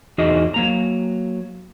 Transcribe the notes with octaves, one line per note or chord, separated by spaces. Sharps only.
E2 D#4 F#4 G#4 D#5
F#3 A#3 A#5